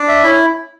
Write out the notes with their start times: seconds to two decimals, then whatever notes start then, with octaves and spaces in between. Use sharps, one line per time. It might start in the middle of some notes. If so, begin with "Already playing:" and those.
Already playing: D4
0.08 E5
0.24 C#4 E4